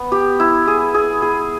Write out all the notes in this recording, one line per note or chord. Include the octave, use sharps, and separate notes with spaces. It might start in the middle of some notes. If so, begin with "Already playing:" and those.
Already playing: B3
G4
E4
G#4
G#4
G#4